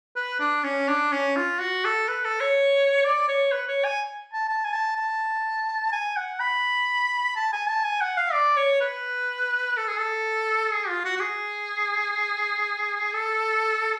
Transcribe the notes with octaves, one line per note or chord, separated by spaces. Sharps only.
B4
D4
C#4
D4
C#4
F4
F#4
A4
B4
A4
C#5
D5
C#5
B4
C#5
G#5
A5
A5
G#5
A5
A5
G#5
F#5
B5
A5
G#5
A5
G#5
F#5
F5
D5
C#5
B4
A4
G#4
A4
G#4
F4
F#4
F#4
G#4
A4